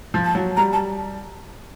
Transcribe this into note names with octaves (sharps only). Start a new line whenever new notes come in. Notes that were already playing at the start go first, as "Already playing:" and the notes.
F3
A5
F#3
G3 A#5
A5